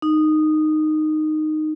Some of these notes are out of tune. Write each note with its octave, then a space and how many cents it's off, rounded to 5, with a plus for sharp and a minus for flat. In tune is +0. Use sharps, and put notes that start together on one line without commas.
D#4 -10